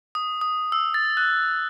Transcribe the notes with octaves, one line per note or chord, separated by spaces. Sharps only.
D#6
D#6
E6
A6
F#6